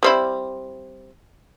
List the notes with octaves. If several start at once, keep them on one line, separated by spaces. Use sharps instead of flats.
G3 C4 E4